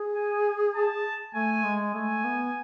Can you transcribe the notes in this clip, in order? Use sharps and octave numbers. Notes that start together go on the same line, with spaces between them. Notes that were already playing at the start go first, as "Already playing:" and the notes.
Already playing: G#4
G#5
A5
A3 G#5
G#3
A3 G#5
B3